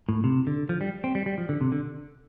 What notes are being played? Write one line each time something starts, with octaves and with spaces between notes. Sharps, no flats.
A2
C3
D3
F3
G3
C4
G3
G3
F3
D3
C3
D3